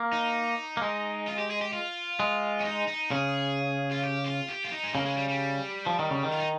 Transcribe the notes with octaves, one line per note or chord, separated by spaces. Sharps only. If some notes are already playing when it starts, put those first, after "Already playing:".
Already playing: A#3
D#4
A#3
G#3
F4
G4
G#4
G4
F4
G#3
C#4
D#4
D#4
C#3 G#4
F4
G4
F4
G4
F4
D#4
G#3
C#3 A#3
G#3
G3
G3
F3
D#3
C#3
D#3
F4
D#4